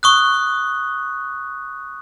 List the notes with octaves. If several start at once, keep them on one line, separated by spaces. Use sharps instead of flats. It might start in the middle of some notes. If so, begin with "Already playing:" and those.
C#6 D#6 F#6